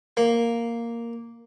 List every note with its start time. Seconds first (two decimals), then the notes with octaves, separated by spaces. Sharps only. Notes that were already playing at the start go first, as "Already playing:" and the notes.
0.17 A#3